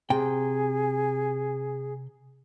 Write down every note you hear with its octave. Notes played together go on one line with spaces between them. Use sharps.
C3 G#4 G5